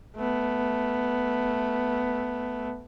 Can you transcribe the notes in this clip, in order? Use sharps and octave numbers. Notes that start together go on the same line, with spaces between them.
A3 B3